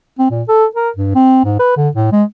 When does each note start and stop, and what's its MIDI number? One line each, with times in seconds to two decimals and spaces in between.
0.19 0.29 60
0.31 0.42 46
0.48 0.65 69
0.75 0.90 70
0.96 1.11 43
1.15 1.41 60
1.44 1.57 44
1.59 1.72 71
1.77 1.89 50
1.95 2.09 45
2.12 2.23 56